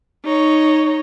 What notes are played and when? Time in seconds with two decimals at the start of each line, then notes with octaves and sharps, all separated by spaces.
0.24 D#4 C#5